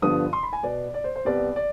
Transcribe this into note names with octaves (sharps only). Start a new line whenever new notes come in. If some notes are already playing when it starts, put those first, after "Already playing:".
G2 D3 F3 B3 D#6
C6
B5
G#5
B2 B3 D5
D5
C5
C5
C2 C3 G3 B3 D5
D5